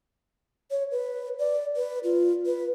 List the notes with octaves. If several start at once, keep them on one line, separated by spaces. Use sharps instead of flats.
C#5
B4
D5
B4
F4
B4